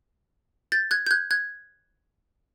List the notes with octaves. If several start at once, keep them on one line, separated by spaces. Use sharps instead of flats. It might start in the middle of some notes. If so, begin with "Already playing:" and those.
G6 A6
F#6 G#6
G6
F#6 G#6
F#6 G#6